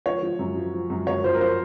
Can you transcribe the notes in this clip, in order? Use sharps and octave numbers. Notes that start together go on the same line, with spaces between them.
F3 C#5
F3
F#2
F3
F3
F#2
F#2 C#5
F3 C5
A#4
F3 C5